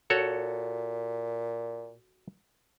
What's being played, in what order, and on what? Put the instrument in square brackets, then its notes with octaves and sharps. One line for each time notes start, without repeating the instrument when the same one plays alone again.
[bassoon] A#2 [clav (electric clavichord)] F#4 A4 C#5